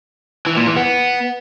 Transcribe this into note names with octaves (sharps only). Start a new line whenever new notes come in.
E3
A#2
E3
B3